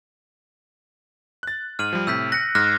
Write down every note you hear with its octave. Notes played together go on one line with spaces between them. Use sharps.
F#6 A6
G#2 F6 D#7 F#7
F3 G3
A2 C3 E6 G6 B6
F#6 A#6 C#7
G#2 F6 F#6 A#6